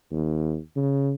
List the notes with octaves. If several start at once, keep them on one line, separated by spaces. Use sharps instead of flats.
D#2
C#3